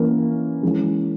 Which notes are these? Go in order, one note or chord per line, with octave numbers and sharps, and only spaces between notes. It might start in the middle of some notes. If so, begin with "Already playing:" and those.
Already playing: E3 A#3 C#4 E4 A#4
E3 G#3 C#4